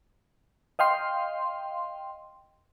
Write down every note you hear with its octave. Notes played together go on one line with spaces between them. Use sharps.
D#5 F5 G5 C6